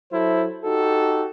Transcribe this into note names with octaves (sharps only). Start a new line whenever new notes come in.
F#3 E4 A4 C5
D#4 F#4 G4 A4